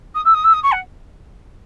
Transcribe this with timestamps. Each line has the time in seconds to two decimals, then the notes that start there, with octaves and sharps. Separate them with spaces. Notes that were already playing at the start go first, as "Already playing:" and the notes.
0.15 D#6
0.25 E6
0.34 D#6
0.44 E6
0.53 D#6
0.63 C#6
0.72 F#5